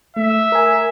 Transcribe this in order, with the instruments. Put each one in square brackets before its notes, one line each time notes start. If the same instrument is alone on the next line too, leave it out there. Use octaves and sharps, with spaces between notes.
[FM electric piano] A3 [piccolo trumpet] E5
[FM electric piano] A#4 G#5